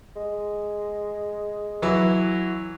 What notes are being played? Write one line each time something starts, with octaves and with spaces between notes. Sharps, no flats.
G#3
E3 F#3 E4